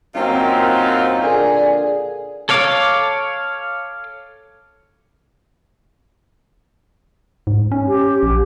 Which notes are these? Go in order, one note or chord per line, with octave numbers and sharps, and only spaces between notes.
F#2 A#3 C4 D#4 F4
A#2 D3 G#4
A4 C#5 F5 D6
G#2
C#4
G4
A#1